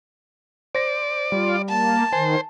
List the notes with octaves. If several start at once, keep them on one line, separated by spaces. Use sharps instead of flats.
C5 D5 A#6
G3 F4
A#3 A5
D#3 C5 G#5